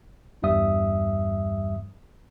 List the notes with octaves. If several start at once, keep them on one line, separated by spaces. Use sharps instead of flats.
G1 E2 G2 G3 E5 D#6